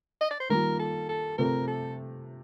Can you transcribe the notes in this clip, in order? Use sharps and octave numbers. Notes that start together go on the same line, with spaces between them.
D#5
D5
C5
D#3 G3 A#3 F4 A#4
A4
A4
C3 F3 A3 C4 A#4
A4